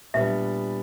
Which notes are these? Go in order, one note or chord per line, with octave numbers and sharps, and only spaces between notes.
A#2 G3 B3 D4 E5